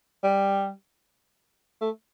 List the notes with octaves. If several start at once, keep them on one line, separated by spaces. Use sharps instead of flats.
G3
A3